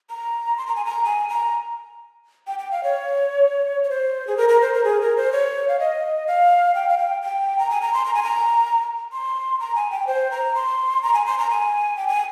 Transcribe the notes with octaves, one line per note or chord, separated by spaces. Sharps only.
A#5
C6
A#5
G#5
A#5
G#5
A#5
G5
G5
F5
C#5
C#5
C5
G#4
A#4
A#4
C5
A#4
G#4
A#4
C5
C#5
F5
D#5
F5
G5
F5
G5
G5
A#5
G#5
A#5
C6
A#5
G#5
A#5
C6
A#5
G#5
G5
C5
A#5
C6
A#5
G#5
C6
A#5
G#5
G5
G#5